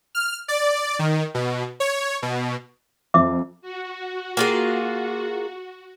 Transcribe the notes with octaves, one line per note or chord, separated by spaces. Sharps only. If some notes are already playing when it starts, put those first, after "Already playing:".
F6
D5
D#3
B2
C#5
B2
F2 E5 D6
F#4
A#3 F4 G#4